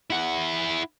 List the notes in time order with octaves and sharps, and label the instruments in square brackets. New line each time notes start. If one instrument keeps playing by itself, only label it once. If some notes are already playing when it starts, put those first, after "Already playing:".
[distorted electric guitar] E4 F#5